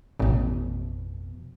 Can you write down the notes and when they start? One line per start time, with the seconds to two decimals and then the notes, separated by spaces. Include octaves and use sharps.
0.19 A1 F2 B2